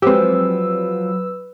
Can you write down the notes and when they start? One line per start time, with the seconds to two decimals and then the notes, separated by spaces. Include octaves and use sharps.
0.02 F3 F#3 G#3 C4 G4 B4 E6